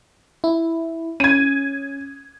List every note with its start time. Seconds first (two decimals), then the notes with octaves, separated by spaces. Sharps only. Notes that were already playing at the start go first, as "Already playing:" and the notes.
0.44 E4
1.20 C#4 G#6 D#7